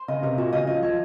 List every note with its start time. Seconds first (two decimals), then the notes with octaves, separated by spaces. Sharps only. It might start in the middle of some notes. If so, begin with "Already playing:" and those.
Already playing: C5
0.08 C#3 D#5
0.23 C3 A#4
0.37 A#2 F#4
0.53 C#3 D#5
0.67 F3 D#5
0.83 F3 C#5